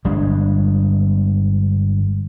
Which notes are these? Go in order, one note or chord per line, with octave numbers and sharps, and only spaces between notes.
G1 G3 G#3 D4